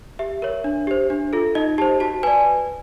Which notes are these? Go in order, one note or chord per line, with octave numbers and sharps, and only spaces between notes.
G4 E5
A#4 C#5
D4
G4 C5
D4
F4 A4
D#4 D#5
G4 C5 A5
F#4 A5
B4 D5 G#5